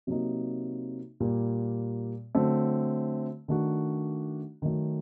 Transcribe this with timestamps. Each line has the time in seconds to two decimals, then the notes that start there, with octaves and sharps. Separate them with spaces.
0.07 C3 F#3 A#3 D#4
1.20 A#2 G3 A#3
2.35 D3 F#3 A3 C4
3.48 D#3 A3 D4 F#4
4.62 D#3 F#3 A3